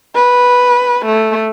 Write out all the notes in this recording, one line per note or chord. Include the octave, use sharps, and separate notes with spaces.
B4
A3